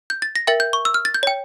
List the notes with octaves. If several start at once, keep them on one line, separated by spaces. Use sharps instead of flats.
G6
A6
A#6
A#4 E5 G5 A6
G6
C#6
E6
F6
A6
G6
C#5 G5